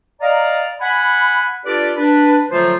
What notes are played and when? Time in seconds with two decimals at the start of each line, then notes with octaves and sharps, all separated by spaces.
0.21 D5 D#5 F5 A#5
0.81 F#5 G#5 B5
1.66 D4 F4 G4 A4 B4 D5
1.97 D4 B4
2.50 D3 F3 F#3 A3 F4 C5